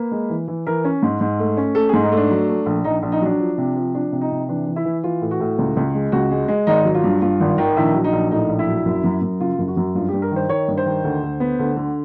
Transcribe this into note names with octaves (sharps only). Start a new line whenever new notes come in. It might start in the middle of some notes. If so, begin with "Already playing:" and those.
Already playing: A#3 B4
G#3
E3
E3
E3 A#4
C#4
G#2
G#2
A3
C#4
A3 A4
G#2 G#4
D#4
A3
D4
F#3
A3
A#1
A#1 D#4
A#1
D#4
F#3 D4
F3
C3
F3
F3 D4
C3
D#4
C3
E3 D4
E3
E4
E3
E3 F4
A2
F#4
A2
C#2
C#2
G#3
C#2 F#4
G#3
G#3
G#1 D#4
F#3
F4
G2
G2 F4
G#1
D#3
A#1 E4
F#3
D#4
A#1
A2 D#4
A#1
E4
F#3
F#2
F#2
F#2
C#3 F4
F#2
F#4
F#2
G2 F4
G4
G2
A#4
D#3 C5
D#3 C#5
G2
C5
D#3
D2
D2
B3
D2
D3